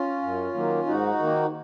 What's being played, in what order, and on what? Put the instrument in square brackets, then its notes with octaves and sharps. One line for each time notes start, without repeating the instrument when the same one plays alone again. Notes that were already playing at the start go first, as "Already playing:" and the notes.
Already playing: [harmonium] C#4 F4
F#2
D#3 F#3 A#3
G#2 D#4 F#4
D#3 A#3